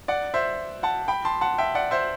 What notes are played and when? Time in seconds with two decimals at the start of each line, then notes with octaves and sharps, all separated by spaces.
0.08 D5 F#5
0.34 C5 E5
0.83 F#5 A5
1.08 G5 B5
1.25 A5 C6
1.41 F#5 A5
1.58 E5 G5
1.75 D5 F#5
1.91 C5 E5